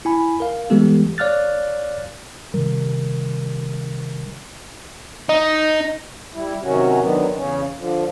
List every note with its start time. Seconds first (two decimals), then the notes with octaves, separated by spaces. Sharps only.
0.05 E4 G#5 B5
0.40 A#4 F5
0.70 E3 G3 G#3 B3 G4 A4
1.18 C#5 D5 F5 F6 F#6 A6
2.54 C3 D#3 G3 A#4
5.29 D#4
6.34 G3 E4
6.63 C3 D#3 F#3 C#4 F#4
7.01 D3 D#3 F#3 B3
7.35 E2 C#3 C#4
7.78 D3 F3